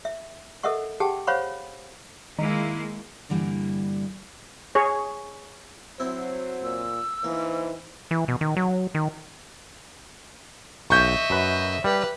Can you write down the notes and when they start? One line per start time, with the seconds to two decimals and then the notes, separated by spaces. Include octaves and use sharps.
0.05 E5
0.63 A4 A#4 D#5 E5 F#5 C#6
1.00 G4 G#4 F#5 G5 A5
1.27 C5 C#5 F5 F#5 B5 C#6
2.39 D#3 G#3 A#3 E4
3.29 G2 D3 E3 G3 A#3
4.75 G#4 C#5
6.00 F#3 C4 E4 C5
6.63 A#2 E6
7.24 E3 A#3 D#4 C5
8.11 E3
8.28 B2
8.41 D#3
8.57 F#3
8.95 D#3
10.90 B1 D#5 E5 C#6 G6
11.30 F#2 B4
11.84 G3 G4 B4